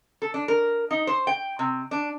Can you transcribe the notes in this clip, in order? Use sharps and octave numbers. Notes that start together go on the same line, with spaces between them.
A4
D4
A#4
D#4
C5
G5
C3
D4